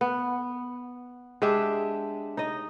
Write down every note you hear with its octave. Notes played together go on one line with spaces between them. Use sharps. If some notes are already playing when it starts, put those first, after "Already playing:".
B3
G#3 D4 G4 E5
D#4 D#5